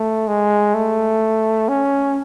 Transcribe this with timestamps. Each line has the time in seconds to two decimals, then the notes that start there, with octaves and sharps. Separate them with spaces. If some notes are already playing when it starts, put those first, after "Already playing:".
Already playing: A3
0.28 G#3
0.74 A3
1.69 C#4